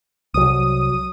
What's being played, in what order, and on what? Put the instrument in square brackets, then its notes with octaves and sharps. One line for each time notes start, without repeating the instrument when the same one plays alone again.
[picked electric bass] C2 F#3 [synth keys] D#6